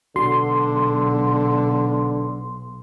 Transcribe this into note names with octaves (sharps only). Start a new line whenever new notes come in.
B1 D3 F#4 C6